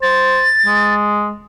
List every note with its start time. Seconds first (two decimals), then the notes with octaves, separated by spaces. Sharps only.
0.02 C5 A6
0.66 G#3